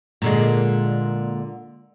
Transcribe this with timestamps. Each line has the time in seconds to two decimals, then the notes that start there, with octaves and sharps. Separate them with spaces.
0.22 A#2 D3 G#3